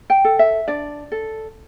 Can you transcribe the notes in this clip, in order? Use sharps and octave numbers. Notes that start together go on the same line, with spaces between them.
G5
A4
E5
D4 D5
A4